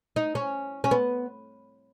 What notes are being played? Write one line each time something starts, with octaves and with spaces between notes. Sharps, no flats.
D#4
C#4
C#4
B3